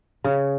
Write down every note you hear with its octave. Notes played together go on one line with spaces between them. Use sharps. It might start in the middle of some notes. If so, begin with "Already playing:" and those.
C#3